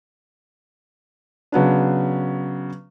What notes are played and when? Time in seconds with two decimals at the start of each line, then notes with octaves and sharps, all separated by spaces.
1.52 C#3 F#3 B3 D4